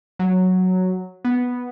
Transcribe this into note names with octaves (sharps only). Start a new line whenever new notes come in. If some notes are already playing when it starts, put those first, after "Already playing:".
F#3
B3